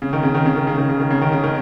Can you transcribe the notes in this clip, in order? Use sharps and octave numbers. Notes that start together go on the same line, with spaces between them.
C#3
D#3
C#3
D#3
C#3
D#3
C#3
D#3
C#3
D#3
C#3
D#3
C#3
D#3